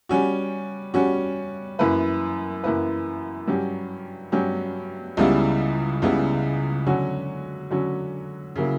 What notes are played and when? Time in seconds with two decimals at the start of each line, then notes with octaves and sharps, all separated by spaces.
0.09 G3 C#4 F#4
0.94 G3 C#4 F#4
1.79 F#2 E3 A#3 E4 B4
2.64 F#2 E3 A#3 E4 B4
3.48 G2 F#3 C#4 G4
4.32 G2 F#3 C#4 G4
5.17 C#2 C#3 G3 B3 E4
6.02 C#2 C#3 G3 B3 E4
6.86 D3 F#3 C#4 F#4
7.71 D3 F#3 C#4 F#4
8.56 C#3 F#3 A#3 E4